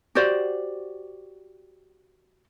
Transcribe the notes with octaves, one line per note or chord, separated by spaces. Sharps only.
F#4 G4 C5 D5